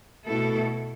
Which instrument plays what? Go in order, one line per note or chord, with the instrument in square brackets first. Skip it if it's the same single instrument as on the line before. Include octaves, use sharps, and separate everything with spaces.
[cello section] B2 A3 E4 A4